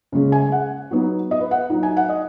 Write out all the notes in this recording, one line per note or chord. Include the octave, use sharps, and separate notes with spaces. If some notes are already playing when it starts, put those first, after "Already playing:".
C#3 G#3 C#4
G#5
F#5
F#3 B3 D#4
D#5
B4
F#5
F#3 D#4
G#5
F#5
D#5